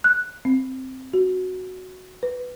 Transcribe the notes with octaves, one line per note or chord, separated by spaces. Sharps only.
F#6
C4
F#4
B4